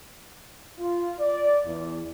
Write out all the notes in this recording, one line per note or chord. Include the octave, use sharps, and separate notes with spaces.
F4
D5
E2